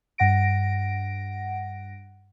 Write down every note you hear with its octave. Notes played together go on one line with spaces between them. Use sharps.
G2 F#5 A#6 D7